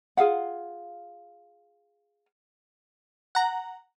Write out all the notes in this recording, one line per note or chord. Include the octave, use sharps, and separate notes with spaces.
F4 G#4 F5 F#5
F#5 A#5